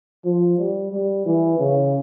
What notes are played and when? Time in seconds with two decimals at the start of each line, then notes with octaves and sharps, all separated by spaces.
0.25 F3
0.58 G3
0.92 G3
1.26 E3
1.59 C#3